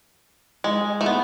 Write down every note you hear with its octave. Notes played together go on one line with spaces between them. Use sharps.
G#3
A3
B3